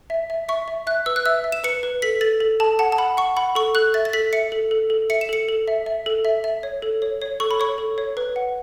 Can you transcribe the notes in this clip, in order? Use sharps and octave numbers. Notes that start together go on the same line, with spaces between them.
E5
E5
E5 C#6
E5
E5 F#6
B4 E6
F#6
E5 E6
E5
E7
B4 C#7
B4
A4 B6
A4 A6
A4
A4 A5
F#5 A5
A5
F#5 B5
F#5 C#6
F#5 B5
A4 C#6
A4 F#6
E5 A6
A6
A4 B6
E5 C#7
A4
A4
A4
E5 C#7
E7
A4 C#7
A4
E5
E5
A4
E5
E5
C#5
A4
C#5
C#5
A4 C#6
B5
C#5 C#6
A4
C#5
B4
F#5